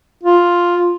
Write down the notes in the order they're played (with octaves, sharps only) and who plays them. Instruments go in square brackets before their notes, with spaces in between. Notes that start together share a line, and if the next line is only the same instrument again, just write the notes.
[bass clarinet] F4